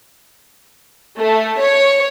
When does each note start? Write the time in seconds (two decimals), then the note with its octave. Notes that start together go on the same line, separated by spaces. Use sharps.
1.18 A3
1.60 C#5